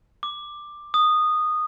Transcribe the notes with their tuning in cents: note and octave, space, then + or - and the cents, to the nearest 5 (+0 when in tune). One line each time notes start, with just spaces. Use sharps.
D6 +10
D#6 -15